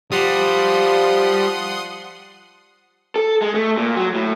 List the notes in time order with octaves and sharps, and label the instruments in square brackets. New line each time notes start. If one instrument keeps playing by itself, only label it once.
[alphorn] F3 [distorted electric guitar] G3 [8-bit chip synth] F#5 C6 D#6
[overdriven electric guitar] A4
G#3
A3
A#2
F#3
A2